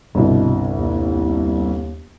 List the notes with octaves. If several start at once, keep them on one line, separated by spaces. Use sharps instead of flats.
G1 C2 B2
D#2